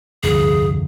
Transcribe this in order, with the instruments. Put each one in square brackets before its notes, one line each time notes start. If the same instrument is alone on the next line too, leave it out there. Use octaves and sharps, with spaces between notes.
[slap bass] F1 [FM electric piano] D2 G2 D3 [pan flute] G#4